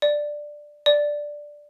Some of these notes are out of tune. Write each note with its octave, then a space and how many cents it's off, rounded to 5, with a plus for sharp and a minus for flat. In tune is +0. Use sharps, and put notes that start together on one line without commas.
D5 +10
D5 +5